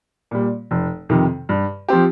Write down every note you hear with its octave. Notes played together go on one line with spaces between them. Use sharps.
A#2 G3
F1
F2 C3 D#3
G2
F3 C4 G4